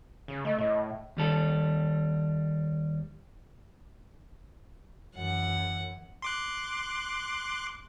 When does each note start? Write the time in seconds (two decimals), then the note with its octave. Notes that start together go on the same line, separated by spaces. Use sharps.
0.28 C#3
0.45 A3 D#5
0.58 A2 D#5
1.17 D#2 G3 A4
5.16 F#2 E3 F#5
6.22 C6 D6 F#6